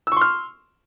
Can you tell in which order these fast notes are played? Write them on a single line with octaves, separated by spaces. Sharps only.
E6 C#6 C6 F6